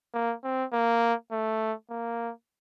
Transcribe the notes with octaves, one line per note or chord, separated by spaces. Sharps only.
A#3
C4
A#3
A3
A#3